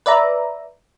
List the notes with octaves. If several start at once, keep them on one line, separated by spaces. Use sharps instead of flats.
B4 D5 E5 A#5